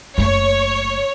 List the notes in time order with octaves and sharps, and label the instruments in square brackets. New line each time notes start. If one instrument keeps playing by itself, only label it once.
[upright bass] F#1 A3 [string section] C#5